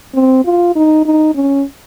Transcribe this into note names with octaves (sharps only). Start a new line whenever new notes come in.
C4
F4
D#4
D#4
C#4